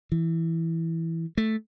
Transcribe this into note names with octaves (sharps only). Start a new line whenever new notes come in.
E3
A3